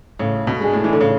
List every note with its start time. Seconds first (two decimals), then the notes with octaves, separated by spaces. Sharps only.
0.19 A2 C#3
0.47 B2
0.60 G#3 D4 G#4
0.73 A2
0.84 E3
0.93 D3
1.00 A2 C#3